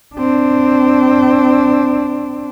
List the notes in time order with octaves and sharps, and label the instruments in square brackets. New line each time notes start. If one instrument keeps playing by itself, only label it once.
[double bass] C4 D4